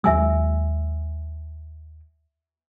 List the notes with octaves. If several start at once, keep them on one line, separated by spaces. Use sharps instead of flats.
D#2 F#3 G#3 E5 G#5 E6